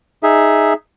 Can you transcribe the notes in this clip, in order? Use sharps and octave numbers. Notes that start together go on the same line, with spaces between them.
D#4 G#4 E5